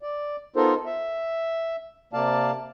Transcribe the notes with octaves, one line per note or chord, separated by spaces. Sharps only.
D5
B3 D#4 F4 A4 A#4 C5
E5
C3 A#3 D5 F5 A5